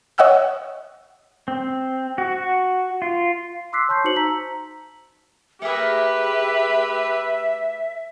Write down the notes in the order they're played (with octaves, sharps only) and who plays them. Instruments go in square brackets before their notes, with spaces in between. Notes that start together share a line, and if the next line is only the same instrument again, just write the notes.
[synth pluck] C#5 D#5 F#5 G5 E6 F#6
[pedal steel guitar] C4
F#4
F4
[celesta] C6 D6 E6 F#6 B6 C7
C#5 A5 C6 C#6 G6
D#4 F#4 C5 C#7 F#7
A5 A#5 E6 B6
[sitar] A3 G#4 A#4 [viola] G4 B4 [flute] E5